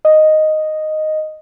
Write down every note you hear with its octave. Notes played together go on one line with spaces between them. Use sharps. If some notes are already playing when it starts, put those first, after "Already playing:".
D#5